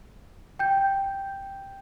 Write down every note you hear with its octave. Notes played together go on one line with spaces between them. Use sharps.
G5 G6